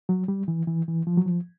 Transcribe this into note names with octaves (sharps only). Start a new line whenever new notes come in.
F#3
G3
E3
E3
E3
F3
F#3
F3